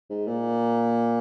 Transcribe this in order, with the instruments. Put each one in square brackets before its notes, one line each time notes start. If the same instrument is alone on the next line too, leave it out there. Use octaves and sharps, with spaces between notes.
[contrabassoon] G#2
A#2